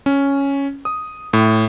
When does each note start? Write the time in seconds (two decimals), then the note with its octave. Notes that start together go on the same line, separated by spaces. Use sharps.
0.06 C#4
0.85 D#6
1.33 A2